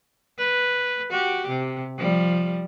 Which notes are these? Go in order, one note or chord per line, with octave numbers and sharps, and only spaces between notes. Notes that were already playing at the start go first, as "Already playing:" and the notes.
B4
F#4 G4
C3
F3 G3